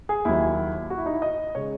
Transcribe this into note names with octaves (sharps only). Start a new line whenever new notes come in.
G#4
D#2 D#3 F#3 E4
F#4
E4
D#4
E4
D#5
C#3 G#3 C#5